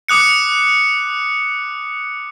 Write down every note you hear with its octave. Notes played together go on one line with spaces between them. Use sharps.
D6 D#6 F#6 C#7